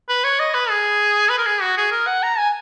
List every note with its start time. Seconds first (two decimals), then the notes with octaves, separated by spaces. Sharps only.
0.09 B4
0.24 C#5
0.39 D#5
0.54 B4
0.70 G#4
1.29 B4
1.38 A#4
1.46 G#4
1.62 F#4
1.77 G#4
1.92 A#4
2.07 F#5
2.23 A#5
2.38 G#5